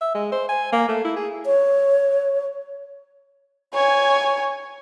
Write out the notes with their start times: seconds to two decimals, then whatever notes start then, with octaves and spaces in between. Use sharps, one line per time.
0.01 E5
0.15 G#3
0.32 C5
0.49 G#5
0.73 A#3
0.89 A3
1.05 E4
1.16 G#4
1.46 C#5
3.74 C#5 G#5